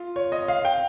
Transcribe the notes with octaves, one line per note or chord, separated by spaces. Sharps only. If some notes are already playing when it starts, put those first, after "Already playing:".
Already playing: F4
C#5
D#5
F5
G5